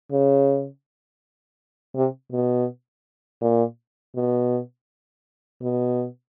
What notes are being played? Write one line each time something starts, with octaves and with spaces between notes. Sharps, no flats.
C#3
C3
B2
A#2
B2
B2